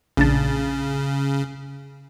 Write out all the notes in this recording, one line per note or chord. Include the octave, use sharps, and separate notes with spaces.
A#1 C#3 D4 A5